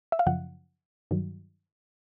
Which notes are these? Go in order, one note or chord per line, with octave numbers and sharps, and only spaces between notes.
E5
F5
F#2 C#3 F3 F#5
G2 D#3 F#3